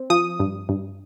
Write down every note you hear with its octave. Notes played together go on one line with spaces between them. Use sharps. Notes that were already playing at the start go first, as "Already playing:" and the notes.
Already playing: C4
F3 D#6
G2
G2